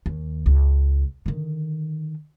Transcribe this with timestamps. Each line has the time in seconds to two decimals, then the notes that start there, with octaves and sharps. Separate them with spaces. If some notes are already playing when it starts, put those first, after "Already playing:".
0.06 D#2
0.46 C#2
1.26 D3 D#3